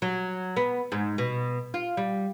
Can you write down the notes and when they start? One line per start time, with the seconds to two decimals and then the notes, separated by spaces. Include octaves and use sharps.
0.02 F#3
0.57 B3
0.92 G#2
1.18 B2
1.74 F4
1.97 G3